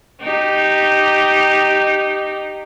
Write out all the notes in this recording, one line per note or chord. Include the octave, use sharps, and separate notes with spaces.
D#4 G4